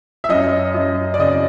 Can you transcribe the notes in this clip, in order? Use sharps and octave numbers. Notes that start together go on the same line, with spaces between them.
E5
F#2 D#5
F#2
D5
C#3 D#5